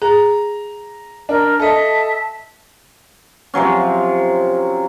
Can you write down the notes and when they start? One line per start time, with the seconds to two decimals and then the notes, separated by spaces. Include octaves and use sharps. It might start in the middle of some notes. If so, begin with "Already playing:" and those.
0.02 G#4 A#5
1.29 D4 A#4
1.60 A4 D#5 E5 A5
3.54 C3 F3 F#3 C#4